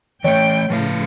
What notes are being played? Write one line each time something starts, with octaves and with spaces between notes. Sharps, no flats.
E3 A3 C#5 G5
A2 C#3 F3 B4 F5